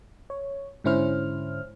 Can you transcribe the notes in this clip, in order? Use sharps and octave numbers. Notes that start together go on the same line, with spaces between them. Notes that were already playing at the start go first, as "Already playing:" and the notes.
C#5
G#2 D3 C#4 E4 C5 F6